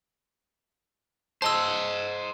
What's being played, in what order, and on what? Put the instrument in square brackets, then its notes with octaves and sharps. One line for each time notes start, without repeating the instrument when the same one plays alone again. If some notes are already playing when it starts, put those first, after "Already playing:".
[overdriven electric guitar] C5 D#5 [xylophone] A5 E6